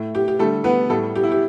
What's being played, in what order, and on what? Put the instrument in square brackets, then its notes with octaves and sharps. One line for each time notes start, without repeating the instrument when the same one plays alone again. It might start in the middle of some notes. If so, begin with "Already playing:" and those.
Already playing: [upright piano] A2 A3
G4
G4
D3 G3 A3 A4
B3 B4
A2 G3 A3 A4
G4
E4
G4